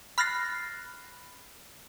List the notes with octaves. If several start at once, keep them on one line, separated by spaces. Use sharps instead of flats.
B5 F6 F#6 A6 A#6 C7